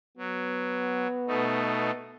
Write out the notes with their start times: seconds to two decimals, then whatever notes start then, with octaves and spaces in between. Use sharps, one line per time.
0.18 F#3 B3
1.27 B2 A3 D#4